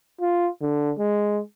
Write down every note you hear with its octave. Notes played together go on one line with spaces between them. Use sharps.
F4
D3
G#3